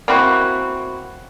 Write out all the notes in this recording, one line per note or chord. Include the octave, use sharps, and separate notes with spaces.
A#3 C4 E4 F#4